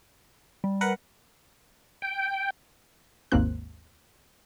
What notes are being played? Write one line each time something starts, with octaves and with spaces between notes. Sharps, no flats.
G3
A#4 B4 F#5
G5
G#1 D#2 A#3 C4 F#6